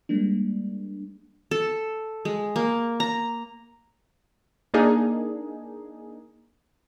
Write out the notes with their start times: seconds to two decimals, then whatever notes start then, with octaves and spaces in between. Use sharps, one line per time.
0.09 G3 G#3 A#3 D4
1.51 A4
2.25 G#3
2.56 A#3
3.00 A#5
4.74 A#3 D4 D#4 G#4